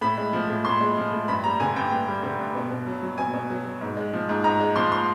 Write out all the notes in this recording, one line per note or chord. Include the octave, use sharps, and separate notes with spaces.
A2 B5
G#3
F3
A2
A2 C6
G#3
F3
A2
G2 B5
G3 A#5
D3 G#5
G2 G5
G2
G3
D3
G2
B2
B2
F#3
F#3
B2 G#5
B2
F#3
F#3
G#2
G#3
F3
G#2
G#2 A#5
G#3
F3 C6
C6